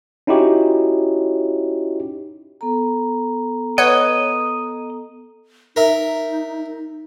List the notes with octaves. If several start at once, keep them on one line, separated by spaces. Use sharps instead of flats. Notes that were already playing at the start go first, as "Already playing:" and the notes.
C#4 D#4 E4 F#4 G4 C#5
B3 A4 A#5
B4 C#5 D#5 F#5
D#4 A#4 E5